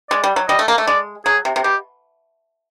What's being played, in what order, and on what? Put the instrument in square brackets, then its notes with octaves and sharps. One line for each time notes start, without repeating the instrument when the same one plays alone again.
[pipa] G#3 [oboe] D5
[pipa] G3
F#3
[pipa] G3 [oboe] D#5
[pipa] A3
A#3
A3
[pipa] G#3 [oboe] D5
[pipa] F#3 [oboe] G#4
[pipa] C3
C3
[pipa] B2 [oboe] G4